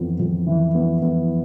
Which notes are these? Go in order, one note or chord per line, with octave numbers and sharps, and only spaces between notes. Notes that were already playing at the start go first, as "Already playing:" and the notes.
Already playing: F2 E3 B3
F2
E3
B3
B3